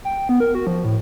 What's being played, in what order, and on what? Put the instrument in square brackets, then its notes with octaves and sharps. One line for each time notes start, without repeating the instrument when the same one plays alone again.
[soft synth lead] G5
B3
A#4
F#4
F3
A2